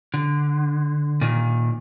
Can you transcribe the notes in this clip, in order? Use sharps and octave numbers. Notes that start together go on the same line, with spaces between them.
D3
A#2 D#3